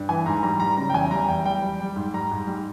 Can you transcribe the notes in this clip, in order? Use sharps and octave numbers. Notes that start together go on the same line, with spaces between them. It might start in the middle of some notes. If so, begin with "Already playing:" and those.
Already playing: G2
E3 G#5
G#2 A#5
G3 A#5
G3 A#5
C#3 A#5
G5
E2 G#5
G3 A#5
E2 G5
G3 G5
G3
G3
G#2
G3 A#5
G#2
G3